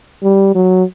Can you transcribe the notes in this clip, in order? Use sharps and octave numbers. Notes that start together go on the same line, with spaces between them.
G3
F#3